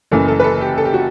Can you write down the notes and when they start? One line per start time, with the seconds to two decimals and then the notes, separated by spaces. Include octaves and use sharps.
0.11 F#1 F#2 E3 A4
0.28 A4
0.40 B4
0.44 A4
0.61 G4
0.78 A4
0.85 G4
0.94 F#4